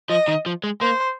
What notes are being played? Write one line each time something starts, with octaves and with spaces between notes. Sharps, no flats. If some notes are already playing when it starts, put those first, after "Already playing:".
F3 D#5
D#3
F3
G#3
A#3 C5